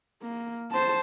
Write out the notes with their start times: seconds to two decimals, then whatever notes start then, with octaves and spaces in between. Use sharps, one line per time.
0.23 A#3
0.71 C5 A5